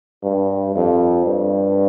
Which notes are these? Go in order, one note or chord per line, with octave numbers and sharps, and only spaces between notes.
G2
F2
G2